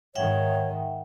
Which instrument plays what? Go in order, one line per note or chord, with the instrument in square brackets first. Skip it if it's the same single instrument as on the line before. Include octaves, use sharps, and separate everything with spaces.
[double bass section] G#2 D#3 [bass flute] C#5 [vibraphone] E5 F#5 G5